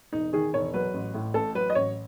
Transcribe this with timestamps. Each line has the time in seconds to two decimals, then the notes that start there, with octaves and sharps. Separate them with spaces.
0.13 E1 D#4
0.33 D#3 G#4
0.54 E1 C#5
0.74 F#3 B4
0.94 A1
1.14 A2
1.34 A1 A4
1.55 F#3 B4
1.70 D#5
1.75 A1 C#5